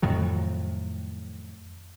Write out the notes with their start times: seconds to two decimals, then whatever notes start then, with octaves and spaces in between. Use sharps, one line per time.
0.02 F2 A2 D#3 F#3